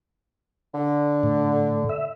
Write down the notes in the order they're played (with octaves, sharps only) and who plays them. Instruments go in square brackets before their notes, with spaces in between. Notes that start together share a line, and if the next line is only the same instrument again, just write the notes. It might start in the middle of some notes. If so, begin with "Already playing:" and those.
[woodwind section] D3
[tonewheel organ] A2
E5